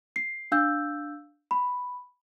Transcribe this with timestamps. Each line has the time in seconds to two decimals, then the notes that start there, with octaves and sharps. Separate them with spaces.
0.16 C7
0.52 D4 F5 E6 G6
1.51 B5